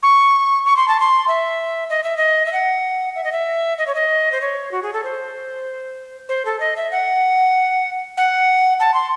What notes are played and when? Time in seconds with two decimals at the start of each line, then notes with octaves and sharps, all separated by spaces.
0.03 C#6
0.66 C#6
0.76 C6
0.88 A5
1.00 C6
1.28 E5
1.90 D#5
2.03 E5
2.17 D#5
2.46 E5
2.53 F#5
3.15 E5
3.24 D#5
3.32 E5
3.78 D#5
3.87 C#5
3.95 D#5
4.32 C5
4.41 C#5
4.72 F#4
4.82 G#4
4.93 A4
5.04 C5
6.29 C5
6.45 A4
6.60 D#5
6.76 E5
6.91 F#5
8.17 F#5
8.80 A5
8.94 C6